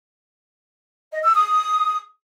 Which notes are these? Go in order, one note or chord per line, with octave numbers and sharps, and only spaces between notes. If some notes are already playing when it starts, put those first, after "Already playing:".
D#5
E6
D#6